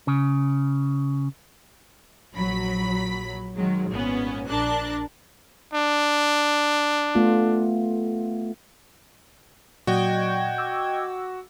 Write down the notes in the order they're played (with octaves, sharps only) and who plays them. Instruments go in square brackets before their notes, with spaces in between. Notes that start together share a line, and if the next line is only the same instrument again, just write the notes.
[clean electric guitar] C#3
[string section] A#1 F#3 B5 B6
D#3 F#3 G#3
G#1 A#2 B3 C#4
A#1 D4 A#4 A5 F#6
[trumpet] D4
[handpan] A3 B3 F4
[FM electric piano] A#2 F#3 D5 [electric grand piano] F#4 [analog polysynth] D#5 G5 G#6
[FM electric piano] D6 E6